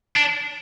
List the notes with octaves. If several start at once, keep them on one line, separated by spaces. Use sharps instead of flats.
D4